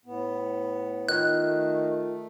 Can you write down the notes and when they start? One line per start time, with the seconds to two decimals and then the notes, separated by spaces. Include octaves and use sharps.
0.05 A2 B3
1.09 D#3 F4 F#6
1.40 A3